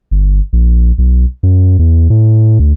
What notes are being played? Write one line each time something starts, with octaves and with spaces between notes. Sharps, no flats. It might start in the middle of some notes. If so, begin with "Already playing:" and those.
G1
A#1
B1
F#2
E2
A2
D2